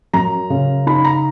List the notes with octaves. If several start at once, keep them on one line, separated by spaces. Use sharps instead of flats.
F#2 A#5
C#3
D#4 B5
A#5